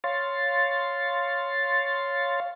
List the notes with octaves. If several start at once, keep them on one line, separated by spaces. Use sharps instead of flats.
C#5 F5 C6 A6